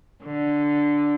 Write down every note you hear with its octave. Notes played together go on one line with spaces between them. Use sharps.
D3